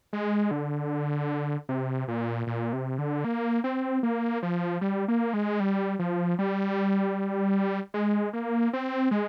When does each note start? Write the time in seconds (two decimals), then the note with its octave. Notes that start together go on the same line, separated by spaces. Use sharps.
0.13 G#3
0.51 D3
1.69 C3
2.08 A#2
2.47 A#2
2.73 C3
2.99 D3
3.25 A#3
3.64 C4
4.03 A#3
4.43 F3
4.81 G3
5.08 A#3
5.34 G#3
5.60 G3
5.99 F3
6.39 G3
7.94 G#3
8.33 A#3
8.73 C4
9.11 G#3